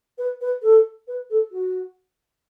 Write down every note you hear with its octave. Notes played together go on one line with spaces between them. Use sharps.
B4
B4
A4
B4
A4
F#4